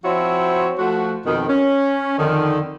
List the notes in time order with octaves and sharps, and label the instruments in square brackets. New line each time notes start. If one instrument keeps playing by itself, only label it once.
[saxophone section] F3 C4 E4 F#4 C#5
F3 A3 F#4
F2 B2 D#3
C#4
F2 D3 D#3